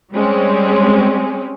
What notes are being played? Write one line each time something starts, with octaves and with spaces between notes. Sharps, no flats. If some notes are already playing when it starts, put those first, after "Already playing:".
G3 G#3 C4 C#4